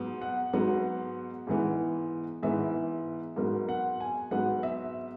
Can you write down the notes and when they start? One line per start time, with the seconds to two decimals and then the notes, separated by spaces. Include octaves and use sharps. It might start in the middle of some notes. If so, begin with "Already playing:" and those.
Already playing: G#2 F#3 B3
0.21 F#5
0.53 G#2 F#3 B3
1.47 G#2 E3 B3
2.43 G#2 E3 B3 E5
3.36 G#2 F#3 B3 A#4
3.69 F#5
4.00 G#5
4.31 G#2 F#3 B3 F#5
4.63 E5